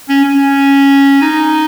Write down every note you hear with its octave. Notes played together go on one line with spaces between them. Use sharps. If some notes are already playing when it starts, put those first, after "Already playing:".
C#4
C#4
D#4